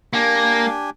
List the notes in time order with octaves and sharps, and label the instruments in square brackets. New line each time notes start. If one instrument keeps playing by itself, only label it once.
[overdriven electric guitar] A#3 [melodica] D4 G4 G#5